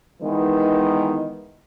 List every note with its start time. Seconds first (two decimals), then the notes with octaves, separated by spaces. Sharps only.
0.22 D#3 E3 G#3 B3